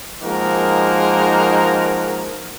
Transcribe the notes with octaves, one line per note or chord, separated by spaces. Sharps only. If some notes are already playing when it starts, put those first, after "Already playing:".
F3 G#3 A#3 D#4 F#4 A#4